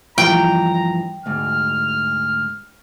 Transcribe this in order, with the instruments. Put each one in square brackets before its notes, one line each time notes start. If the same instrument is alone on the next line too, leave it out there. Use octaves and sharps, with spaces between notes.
[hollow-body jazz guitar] G2 E3 F3 [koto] G5 [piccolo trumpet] A#5
[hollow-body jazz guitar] D2 G#2 [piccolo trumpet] F6